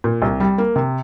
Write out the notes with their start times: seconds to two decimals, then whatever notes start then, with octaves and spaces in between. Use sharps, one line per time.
0.04 A#2
0.22 C2
0.40 G3
0.58 A#3
0.76 C3